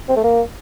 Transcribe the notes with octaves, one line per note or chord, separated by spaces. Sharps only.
C4
A3
A#3